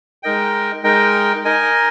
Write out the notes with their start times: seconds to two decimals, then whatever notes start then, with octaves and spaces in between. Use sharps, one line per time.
0.23 G#3 D#4 A#4 D#5 G5
0.84 G#3 D#4 A#4 D#5 G5
1.45 D#4 A#4 D#5 G#5